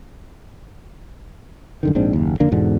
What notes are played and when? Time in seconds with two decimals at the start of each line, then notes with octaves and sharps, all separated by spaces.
1.83 F#2 D3 D#3
1.95 A#1 G#2 C4 D4
2.13 F#1 D#2
2.40 F2 D3 A#3 D4
2.52 E2 G#2 B2 D3